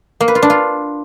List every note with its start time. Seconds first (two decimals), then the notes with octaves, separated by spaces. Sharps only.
0.21 A#3
0.28 B4
0.35 F4
0.43 D4
0.50 F4